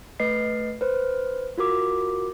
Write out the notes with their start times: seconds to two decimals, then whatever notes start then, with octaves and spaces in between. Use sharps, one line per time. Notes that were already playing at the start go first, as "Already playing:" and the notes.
0.20 A3 B4 D#5 C7
0.81 B4 C5
1.58 F4 F#4 A#4 D6